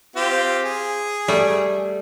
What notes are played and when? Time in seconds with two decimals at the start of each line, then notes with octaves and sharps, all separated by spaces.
0.16 C4 F4 G4
0.65 G#4
1.28 G3 A3